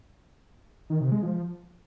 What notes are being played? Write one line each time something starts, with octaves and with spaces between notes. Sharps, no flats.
D#3
C3
G#3
F3